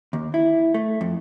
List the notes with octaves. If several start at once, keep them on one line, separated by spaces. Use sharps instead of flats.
D#2
E4
A3
F2